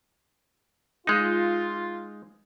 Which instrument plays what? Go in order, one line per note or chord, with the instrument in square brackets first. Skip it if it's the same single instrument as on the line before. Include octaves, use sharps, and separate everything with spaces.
[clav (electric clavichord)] G#3 D#4 [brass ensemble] F4